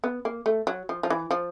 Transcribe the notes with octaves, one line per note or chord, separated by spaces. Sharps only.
B3
A#3
A3
F#3
F3
F3
E3
F3